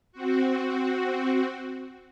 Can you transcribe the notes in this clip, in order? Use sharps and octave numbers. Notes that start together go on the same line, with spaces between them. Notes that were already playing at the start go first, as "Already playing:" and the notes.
C4 F#4